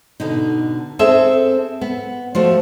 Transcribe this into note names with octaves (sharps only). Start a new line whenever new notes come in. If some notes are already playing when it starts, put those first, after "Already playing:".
B2 D3 D#4
C4 G#4 A4 E5
B3
F3 A3 F#4